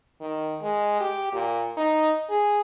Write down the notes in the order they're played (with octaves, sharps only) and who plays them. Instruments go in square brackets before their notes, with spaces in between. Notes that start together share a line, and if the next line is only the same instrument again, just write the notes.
[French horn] D#3
G#3
G4
A#2
D#4
G#4